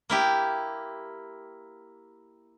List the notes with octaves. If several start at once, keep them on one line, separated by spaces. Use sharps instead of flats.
A#3 E4 G4